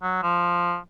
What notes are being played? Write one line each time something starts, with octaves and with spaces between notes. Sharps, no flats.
F#3
F3